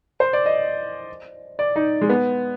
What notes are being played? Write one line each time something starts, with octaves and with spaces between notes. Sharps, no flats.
C5
D5
D#5
D5
D#4
G#3
B3